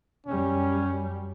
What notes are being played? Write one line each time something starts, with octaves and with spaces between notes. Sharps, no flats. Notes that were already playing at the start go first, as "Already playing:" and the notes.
F#2 G3 C#4